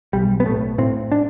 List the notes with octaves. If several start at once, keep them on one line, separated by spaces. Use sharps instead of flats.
B1 G3
B3
A2 A3
A2 C4
D4